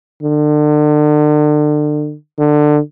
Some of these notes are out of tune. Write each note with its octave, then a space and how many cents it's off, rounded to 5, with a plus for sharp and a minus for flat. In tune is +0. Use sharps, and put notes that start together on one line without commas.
D3 +35
D3 +20